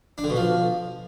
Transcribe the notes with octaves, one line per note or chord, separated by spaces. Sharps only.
D4
D3
B2
F3